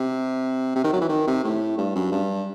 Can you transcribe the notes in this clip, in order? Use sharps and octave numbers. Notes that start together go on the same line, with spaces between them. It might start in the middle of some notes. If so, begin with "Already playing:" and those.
Already playing: C3
C3
D#3
F#3
E3
D#3
C3
A2
G2
F#2
G2